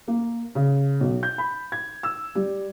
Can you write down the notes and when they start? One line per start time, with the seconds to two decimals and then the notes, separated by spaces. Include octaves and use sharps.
0.08 A#3
0.55 C#3
1.00 B1
1.23 G6
1.38 B5
1.72 G#6
2.03 E6
2.35 G3